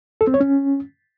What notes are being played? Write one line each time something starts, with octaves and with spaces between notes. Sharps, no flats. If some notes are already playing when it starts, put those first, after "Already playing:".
A4
C4
C#5
C#4